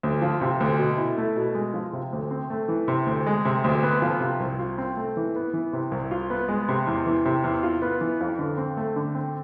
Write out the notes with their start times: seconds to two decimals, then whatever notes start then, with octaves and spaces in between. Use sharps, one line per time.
0.03 D2
0.22 F3
0.41 C3
0.60 D2
0.79 B2
0.98 E4
1.18 A3
1.36 B2
1.55 G#3
1.74 F3
1.93 C3
2.13 D2
2.31 C4
2.50 A3
2.68 E3
2.88 C3
3.06 D2
3.26 G#3
3.45 C3
3.64 D2
3.83 B3
4.02 F3
4.20 C3
4.40 C2
4.59 F4
4.78 C4
4.97 A3
5.17 E3
5.36 B3
5.53 E3
5.73 C3
5.91 C2
6.11 F4
6.30 B3
6.49 G#3
6.68 C3
6.87 E2
7.06 E3
7.25 C3
7.44 E2
7.63 F4
7.82 B3
8.01 E3
8.21 F2
8.39 D3
8.58 C4
8.77 A3
8.96 D3
9.15 C4